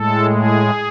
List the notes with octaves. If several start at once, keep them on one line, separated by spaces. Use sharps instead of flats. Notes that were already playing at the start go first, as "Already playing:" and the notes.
Already playing: A2 G#3 A4
G#4